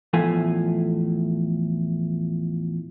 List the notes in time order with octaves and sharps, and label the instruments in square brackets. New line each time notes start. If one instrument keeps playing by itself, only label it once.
[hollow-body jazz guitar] E2 A2 F3 A3 G#5